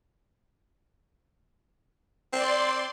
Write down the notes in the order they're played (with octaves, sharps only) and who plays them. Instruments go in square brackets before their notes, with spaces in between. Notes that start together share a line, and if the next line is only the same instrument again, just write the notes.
[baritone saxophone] C4 [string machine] D5 C6